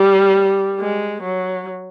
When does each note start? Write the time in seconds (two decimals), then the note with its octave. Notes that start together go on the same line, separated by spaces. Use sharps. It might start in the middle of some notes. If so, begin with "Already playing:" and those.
Already playing: G3
0.80 G#3
1.23 F#3